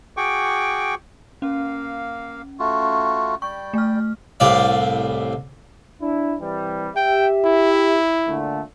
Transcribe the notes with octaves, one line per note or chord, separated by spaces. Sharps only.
F#4 G#4 G5 C#6 D6
A#3 C#4 F5
A3 F4 F#4
G3 G5 C#6
A3 F6
C2 A2 D5 F5
D4 E4
C3 E3 G3
G4 E5 G5
E4
A#2 D3 A3